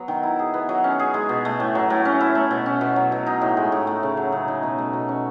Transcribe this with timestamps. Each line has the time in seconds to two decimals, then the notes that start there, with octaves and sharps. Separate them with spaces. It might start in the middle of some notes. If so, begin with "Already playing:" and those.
Already playing: F#3 B3
0.08 D#3
0.23 E4
0.39 G#4
0.54 B3
0.69 F#3
0.84 C#4
0.99 G#4
1.14 G#3
1.29 B2
1.45 A3
1.60 A2
1.75 F#3
1.90 A2
2.05 C#4
2.21 E4
2.35 A3
2.51 B2
2.66 C#4
2.81 B2
2.96 F#3
3.12 B2
3.26 D#4
3.41 A2
3.57 G#3
3.72 A2
3.87 A3
4.03 C#3
4.17 F#3
4.32 C#3
4.48 D#4
4.63 B2
4.78 A3
4.93 B2
5.09 C#4